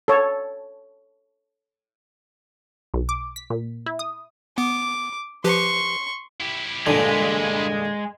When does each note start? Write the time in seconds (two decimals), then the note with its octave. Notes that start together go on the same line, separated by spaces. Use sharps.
0.08 A4 C#5
2.94 B1
3.09 D6
3.36 B6
3.50 A#2
3.86 E4
3.99 D#6
4.58 B3 D6
5.44 F3 G4 B4 C6 C#6
6.41 E4 G4
6.87 E2 G2 A#2 D3 G#3 G#4